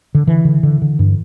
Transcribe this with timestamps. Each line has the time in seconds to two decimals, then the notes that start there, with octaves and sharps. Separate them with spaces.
0.15 D3
0.27 D3 E3
0.45 D3
0.63 D3
0.82 D3
0.99 G2